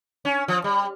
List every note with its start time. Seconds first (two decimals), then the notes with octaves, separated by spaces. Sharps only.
0.25 C#4
0.48 F3
0.64 G3